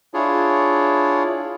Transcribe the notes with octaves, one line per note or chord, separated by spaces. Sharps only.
D4 E4 F4 G#4 C#5